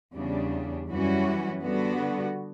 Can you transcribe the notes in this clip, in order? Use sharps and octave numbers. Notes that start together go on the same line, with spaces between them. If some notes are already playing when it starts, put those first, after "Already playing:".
E2 C#3 G3 D4
F#2 E3 G3 C#4 F#4
D3 G3 B3 F#4